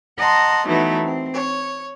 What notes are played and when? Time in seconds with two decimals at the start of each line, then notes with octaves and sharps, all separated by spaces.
0.17 D#5 F#5 A5 A#5 C6
0.66 E3 F#3 A3 B3 D#4 E4
1.02 C4
1.34 C#5